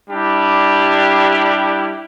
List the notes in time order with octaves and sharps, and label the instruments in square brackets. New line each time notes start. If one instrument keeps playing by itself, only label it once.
[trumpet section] G3 D4 E4 G4